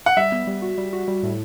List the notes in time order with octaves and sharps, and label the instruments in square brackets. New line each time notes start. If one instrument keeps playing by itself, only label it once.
[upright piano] F#5
[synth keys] G3 [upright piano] E5
[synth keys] B3
G3
F#4
G3
F#4
G3
A2